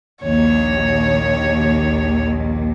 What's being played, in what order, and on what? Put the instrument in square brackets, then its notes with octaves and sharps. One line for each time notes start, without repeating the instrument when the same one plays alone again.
[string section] A#1 D#2 D#3 [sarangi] C#5